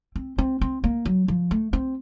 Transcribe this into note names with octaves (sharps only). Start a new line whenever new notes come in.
C4
C4
C4
A#3
F#3
F3
A3
C4